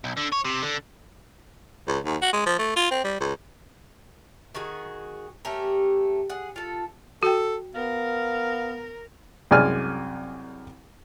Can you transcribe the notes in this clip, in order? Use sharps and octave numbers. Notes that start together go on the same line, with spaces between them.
B1
D3
C#5
C3
D3
C#2
D#2
F#4
G#3
F3
A3
F4
C4
G3
C#2
D#3 F#4 G#4
A3 C#4 G4 A#4
G#4 F#5
F4 A4
F#4 A4 G5
B3 A#4 F5
C2 F#2 G#3 D5 G#5 F6